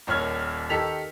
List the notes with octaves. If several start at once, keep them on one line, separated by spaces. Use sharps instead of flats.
D#1 D#2 C#5 F6 G#6
D#3 G4 A4 B6 F7